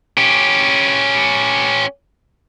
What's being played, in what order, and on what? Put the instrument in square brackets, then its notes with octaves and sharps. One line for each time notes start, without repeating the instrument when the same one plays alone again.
[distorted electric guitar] C#4 G4